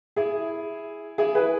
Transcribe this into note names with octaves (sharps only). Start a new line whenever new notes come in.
E4 G#4
E4 G#4
G#4 B4